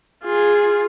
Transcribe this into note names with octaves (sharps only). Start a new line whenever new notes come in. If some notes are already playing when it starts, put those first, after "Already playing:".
F4 G#4